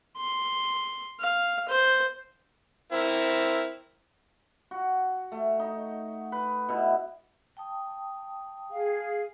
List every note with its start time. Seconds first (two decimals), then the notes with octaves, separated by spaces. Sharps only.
0.18 C6
1.20 F5
1.69 C5
2.92 C4 E4 A#4
4.71 F#4
5.32 A3
5.60 D#4
6.32 B4
6.69 B2 E4
7.57 G5 A5 D#6
8.71 G#4 F5